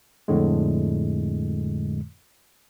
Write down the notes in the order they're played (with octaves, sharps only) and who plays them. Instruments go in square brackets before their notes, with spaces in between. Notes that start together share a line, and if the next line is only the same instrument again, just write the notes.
[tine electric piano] F2 A2 D3 G#3